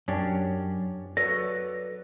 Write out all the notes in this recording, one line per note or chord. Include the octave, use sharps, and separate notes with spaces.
F#2 C#4 D4 G4
F#3 A4 B4 C#5 D5 A#6